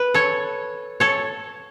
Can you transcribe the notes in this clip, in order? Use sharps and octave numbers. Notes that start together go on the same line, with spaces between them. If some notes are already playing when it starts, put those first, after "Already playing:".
Already playing: B4
A4 C#5
A4 C#5